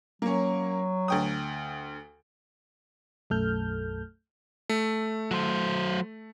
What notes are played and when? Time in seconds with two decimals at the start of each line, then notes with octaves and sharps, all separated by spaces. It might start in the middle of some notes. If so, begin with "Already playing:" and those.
0.22 F#3 A#3 C#4
1.08 D2 G5 D#6
3.30 B1 F#2 A3 A4 F6 G6
4.69 A3
5.31 F#3 C5